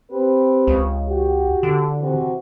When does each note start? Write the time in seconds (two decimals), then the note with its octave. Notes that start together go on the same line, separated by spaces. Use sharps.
0.11 C4 G4 B4
0.67 C#2
1.08 F#4 G4
1.63 D3
1.99 C3 E3 F#4